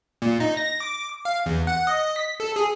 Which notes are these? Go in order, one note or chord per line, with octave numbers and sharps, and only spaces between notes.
A#2
D#4
A#6
D6
F5
E2
F#5
D#5
B6
A4
G#4